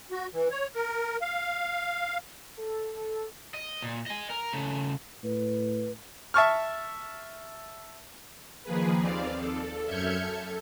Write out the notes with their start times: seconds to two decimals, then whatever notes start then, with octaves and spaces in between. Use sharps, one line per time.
0.11 F#4
0.33 E3
0.51 C#5
0.75 A#4
1.22 F5
2.58 A4
3.54 D#5
3.82 A#2
4.06 D#5 G#5
4.30 A#4
4.53 C#3 A3
5.24 A2 B4
6.34 E5 A5 C#6 F6
8.63 D#3 F3 A#3 G#4 B4
8.99 D#2 C4 D5 F5
9.36 A4
9.87 F#2 E5 F6 G6 G#6 C#7
10.20 A4